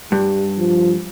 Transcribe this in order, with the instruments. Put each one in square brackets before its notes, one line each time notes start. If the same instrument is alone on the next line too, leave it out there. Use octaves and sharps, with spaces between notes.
[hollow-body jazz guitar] G2 [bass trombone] G3
[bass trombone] F3